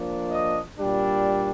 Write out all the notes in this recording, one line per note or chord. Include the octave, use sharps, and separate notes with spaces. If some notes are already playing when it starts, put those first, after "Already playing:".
Already playing: F3 A#3 D4
D#5
A#2 G3 D4